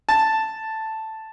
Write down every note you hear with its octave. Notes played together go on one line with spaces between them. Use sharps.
A5